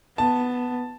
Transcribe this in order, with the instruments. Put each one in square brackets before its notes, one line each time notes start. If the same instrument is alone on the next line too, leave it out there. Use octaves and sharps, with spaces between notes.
[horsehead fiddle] B3 [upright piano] A5